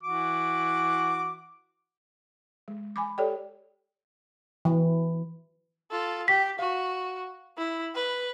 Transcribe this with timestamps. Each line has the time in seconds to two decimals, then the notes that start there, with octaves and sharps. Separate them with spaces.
0.03 E3 F#4 D6
2.68 G#3
2.96 G#5 B5 D6
3.18 G4 A4 C#5 D5 G5
4.65 E3
5.91 F4 A4
6.28 G4 B6
6.59 F#4 F5
7.57 E4
7.95 B4